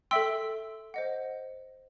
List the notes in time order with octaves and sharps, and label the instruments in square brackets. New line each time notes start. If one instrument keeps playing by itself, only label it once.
[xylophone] A4 E5 G5 C6 E6
C5 D#5 F#5